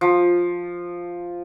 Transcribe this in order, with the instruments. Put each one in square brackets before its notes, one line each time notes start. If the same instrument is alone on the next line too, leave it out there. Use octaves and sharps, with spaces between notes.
[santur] F3